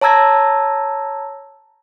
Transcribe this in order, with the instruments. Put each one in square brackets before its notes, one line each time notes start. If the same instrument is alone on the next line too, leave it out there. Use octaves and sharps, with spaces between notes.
[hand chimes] C#5 A5 A#5 E6 G#6 A#6